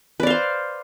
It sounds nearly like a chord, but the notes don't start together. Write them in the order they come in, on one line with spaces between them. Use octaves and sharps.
B4 D5 F5 C5